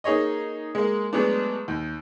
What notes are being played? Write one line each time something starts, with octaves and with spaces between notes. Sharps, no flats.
A#3 D#4 G#4 C#5 D#5
G#3 A#3
F#3 G#3 A3 B3 D4
D#2